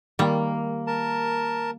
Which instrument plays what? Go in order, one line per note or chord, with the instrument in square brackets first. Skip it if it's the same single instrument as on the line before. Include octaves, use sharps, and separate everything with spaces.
[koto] D#3 G3 [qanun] A#3
[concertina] A#4 A5